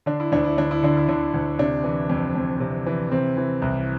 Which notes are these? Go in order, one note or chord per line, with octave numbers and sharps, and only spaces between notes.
D3 D4
E4
D2 D4
E4
D2 D4
E4
D3 D4
E4
D3 D4
D2
C3 D4
E3
F2
F2
C3
E3
C3 C4
E3
C2